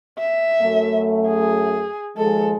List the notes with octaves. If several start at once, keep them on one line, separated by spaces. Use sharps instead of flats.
E5
F#2 A3
G#4
D#2 F3 G#3 A4